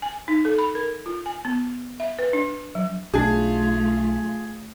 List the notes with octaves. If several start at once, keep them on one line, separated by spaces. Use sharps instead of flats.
G#5
D#4
A4
B5
A#4
F4
G#5
B3
E5
B4
D4
F#3
B1 A3 D4 F4 G#4